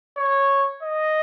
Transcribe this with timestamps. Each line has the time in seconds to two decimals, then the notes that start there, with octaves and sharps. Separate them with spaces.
0.17 C#5
0.83 D#5